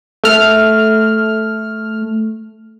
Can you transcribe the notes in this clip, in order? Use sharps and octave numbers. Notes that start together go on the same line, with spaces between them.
A3 F6